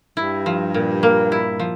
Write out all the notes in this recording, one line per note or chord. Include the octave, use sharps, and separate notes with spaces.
G2 E4
F3
A#2
A#3
E4
F3